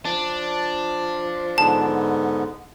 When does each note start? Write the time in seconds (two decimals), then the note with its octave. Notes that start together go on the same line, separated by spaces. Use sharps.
0.05 F3 D4
1.58 G#2 D3 B3 A5